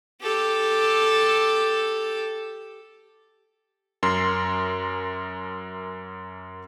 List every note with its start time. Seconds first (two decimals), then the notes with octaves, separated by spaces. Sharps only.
0.22 G4 A4
4.03 F#2 A#4 C6 C7